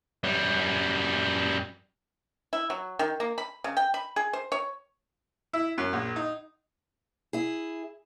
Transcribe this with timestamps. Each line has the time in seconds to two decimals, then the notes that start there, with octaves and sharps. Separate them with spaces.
0.24 F#2 G3
2.53 E4
2.70 F#3
2.99 D#3
3.20 A#3
3.38 B5
3.64 C#3
3.77 G5
3.94 B5
4.16 G#4
4.33 C5
4.52 C#5
5.53 E4
5.78 F#2
5.93 A#1
6.16 D#4
7.33 E4 G#4